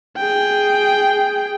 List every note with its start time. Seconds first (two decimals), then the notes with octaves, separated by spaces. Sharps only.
0.17 G#4 G5